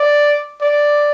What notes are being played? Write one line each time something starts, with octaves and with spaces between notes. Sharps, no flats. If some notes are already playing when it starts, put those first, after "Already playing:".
Already playing: D5
D5